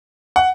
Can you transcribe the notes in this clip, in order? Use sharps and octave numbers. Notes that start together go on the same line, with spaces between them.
F#5